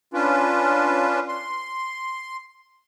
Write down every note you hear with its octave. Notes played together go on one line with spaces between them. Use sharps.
C#4 D4 F4 B4
C6